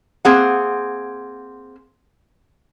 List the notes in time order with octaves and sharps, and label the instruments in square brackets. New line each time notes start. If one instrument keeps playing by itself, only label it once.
[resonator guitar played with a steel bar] A#3 C4 G#4 F#5